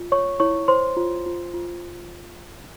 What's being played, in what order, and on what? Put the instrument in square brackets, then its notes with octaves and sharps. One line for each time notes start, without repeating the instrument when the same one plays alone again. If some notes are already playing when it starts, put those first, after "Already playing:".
Already playing: [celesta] F4
C#5 C#6
E4 C#5 C#6
C5 C#5 C6
F4
F4
F4